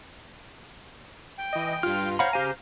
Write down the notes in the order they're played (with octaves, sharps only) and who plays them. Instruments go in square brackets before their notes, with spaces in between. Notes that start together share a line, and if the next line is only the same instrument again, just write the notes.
[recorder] G5
[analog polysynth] E3 D#5
[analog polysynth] G2 F4 [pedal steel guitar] F6
[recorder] C5 [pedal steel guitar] C#5 F#5 B5 [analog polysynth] F5 A#5
[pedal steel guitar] C#3 G4 G#5 [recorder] C5